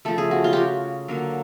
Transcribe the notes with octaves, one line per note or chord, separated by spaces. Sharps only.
C#3 F3 A3 A4
G#4
F#4
F4
F#4 G4
D3 F#3 A#3